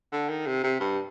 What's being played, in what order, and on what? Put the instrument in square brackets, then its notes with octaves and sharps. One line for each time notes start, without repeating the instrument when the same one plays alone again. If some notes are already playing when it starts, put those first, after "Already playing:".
[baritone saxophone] D3
D#3
C3
C3
G2